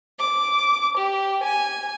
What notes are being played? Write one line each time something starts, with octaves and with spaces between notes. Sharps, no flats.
D6
G4
G#5